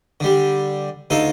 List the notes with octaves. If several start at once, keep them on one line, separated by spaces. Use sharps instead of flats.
D3 G3
D2 D#4 F4 A4